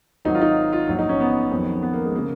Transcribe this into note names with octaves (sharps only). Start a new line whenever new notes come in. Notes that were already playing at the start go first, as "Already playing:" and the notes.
G#1 G#2 D#3 F#3 D#4
F4
D#4
F4
A#1 G#2 F#3
D#4
C#4
B3
F2 D#3 F#3
B3
A#3
G#3
C#3 A#3